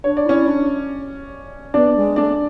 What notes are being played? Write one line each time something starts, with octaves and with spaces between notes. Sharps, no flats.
D4 C#5
D5
C#4 E4 C#5
D4
B3 D4 D5
G#3
A3 D4 D5